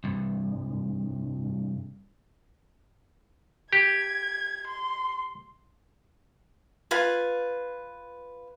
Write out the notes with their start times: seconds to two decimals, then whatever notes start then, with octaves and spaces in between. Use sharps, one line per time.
0.04 C2 G2
3.73 G4 G#6
4.67 C6
6.91 F4 B4 G#5